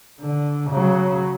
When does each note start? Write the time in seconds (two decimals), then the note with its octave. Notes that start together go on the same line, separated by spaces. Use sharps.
0.20 D3
0.70 C#3 F#3